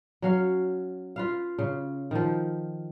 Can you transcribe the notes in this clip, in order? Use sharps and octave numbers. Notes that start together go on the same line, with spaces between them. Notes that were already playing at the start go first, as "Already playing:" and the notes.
F#3 C#4 F5
F4 B4 F5
C#3
D#3 F3